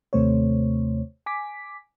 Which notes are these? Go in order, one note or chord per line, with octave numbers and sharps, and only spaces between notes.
D#2 C3 A3 C5 C#5
G#5 D6 B6